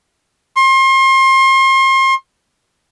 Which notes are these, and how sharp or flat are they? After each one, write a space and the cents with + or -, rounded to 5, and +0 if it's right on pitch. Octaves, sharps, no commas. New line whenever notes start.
C6 +35